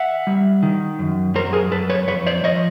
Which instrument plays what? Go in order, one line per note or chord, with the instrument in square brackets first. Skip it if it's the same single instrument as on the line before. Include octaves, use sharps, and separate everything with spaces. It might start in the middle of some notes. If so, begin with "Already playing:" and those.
Already playing: [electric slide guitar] E5 F#5
G3
D#3
F#2
F#2 A#4 C5
G#4 A#4
F#2 A4 B4
B4 C#5
F2 B4 C#5
C5 D5
F3 C#5 D#5